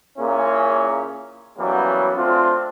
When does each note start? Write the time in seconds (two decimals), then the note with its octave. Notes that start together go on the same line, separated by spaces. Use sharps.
0.18 A#2 A#3 C#4 E4 G#4
1.58 E3 F#3 G3 A#3 B3 C#4
2.16 A3 C4 D4 F4